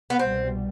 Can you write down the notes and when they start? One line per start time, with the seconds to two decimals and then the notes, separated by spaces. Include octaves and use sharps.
0.10 B3
0.19 C2 B2 G3 C4